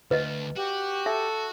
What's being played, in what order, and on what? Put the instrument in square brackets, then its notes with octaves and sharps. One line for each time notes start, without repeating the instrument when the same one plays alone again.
[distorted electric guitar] D2 [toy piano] B4 D#5
[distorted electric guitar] F#4 [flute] G4
[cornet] A4 [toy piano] E5